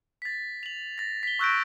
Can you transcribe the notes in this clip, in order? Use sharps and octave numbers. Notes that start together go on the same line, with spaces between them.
A6 B6
F7 F#7
A6 A#6
B6 G7
C#6 E6 F#6 G6 A#6 D7